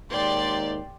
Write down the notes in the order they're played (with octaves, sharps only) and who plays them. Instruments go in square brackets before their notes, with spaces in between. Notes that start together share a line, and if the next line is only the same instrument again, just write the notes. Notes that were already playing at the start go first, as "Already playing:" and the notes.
[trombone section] D#2 G#2 [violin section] G4 D5 C6